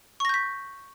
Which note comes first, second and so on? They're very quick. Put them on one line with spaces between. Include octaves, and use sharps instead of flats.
C#6 A#6 G6 B6